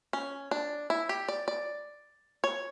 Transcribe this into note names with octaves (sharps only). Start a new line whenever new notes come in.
C#4
D4
E4
G4
D5
D5
C#5